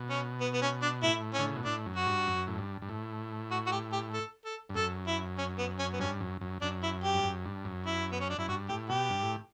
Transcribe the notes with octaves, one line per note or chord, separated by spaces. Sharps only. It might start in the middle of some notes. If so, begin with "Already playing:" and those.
Already playing: B2
C#4
B3
B3
C#4
D4
A2 E4
C#4
D3
C#3
B2
A2 D4
F#2
F#4
G2
F#2
A2
G2
G2
A2
F#4
F#4
G4
G4
A4
A4
G2
F#2 A4
E4
C#4
B3
C#4
B3
G2 C#4
F#2
F#2
F#2 D4
E4
G4
G2
F#2
G2
F#2
E4
B3
C#4
D4
F#2 E4
G2 F#4
A2 G4
B2 G4
G2
A2